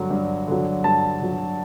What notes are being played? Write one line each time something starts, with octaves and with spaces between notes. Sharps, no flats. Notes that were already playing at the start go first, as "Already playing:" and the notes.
Already playing: G2 D3 F#3
G2
D3 F#3
G2 A5
D3 F#3